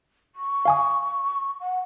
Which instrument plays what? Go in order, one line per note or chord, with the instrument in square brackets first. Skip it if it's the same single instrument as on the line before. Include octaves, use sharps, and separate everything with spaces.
[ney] C#6
[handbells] F5 G#5 D#6
[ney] F#5